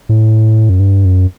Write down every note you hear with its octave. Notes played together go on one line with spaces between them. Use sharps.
A2
F#2
G2
F#2